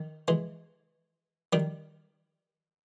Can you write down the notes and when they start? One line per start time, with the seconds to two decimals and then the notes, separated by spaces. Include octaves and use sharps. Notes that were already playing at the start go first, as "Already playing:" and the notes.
Already playing: D#3
0.28 E3 G#3
1.53 D#3 G3